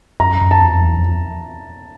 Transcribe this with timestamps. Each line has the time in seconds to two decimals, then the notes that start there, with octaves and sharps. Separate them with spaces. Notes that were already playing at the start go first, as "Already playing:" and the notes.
0.20 F#2 A#5
0.41 F#2
0.51 A5
0.61 F2
0.82 E2
0.98 F2